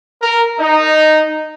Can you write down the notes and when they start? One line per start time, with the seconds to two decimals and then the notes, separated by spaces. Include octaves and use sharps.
0.22 A#4
0.60 D#4